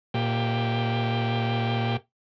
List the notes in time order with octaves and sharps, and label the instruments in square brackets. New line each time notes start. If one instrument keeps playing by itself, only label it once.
[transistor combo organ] A#2 G4